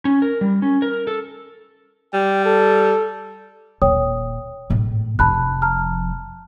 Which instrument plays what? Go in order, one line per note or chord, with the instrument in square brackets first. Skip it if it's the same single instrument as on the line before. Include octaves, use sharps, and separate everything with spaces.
[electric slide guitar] C#4
A#4
G3
C#4
A#4
A4
[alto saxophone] G3 [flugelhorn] G5
[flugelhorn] A4
[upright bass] D#1 [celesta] C#5 G5 D#6
[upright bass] G#1 A2
[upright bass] F1 F2 [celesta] A5 B5 F#6
[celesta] A5 A#5 F6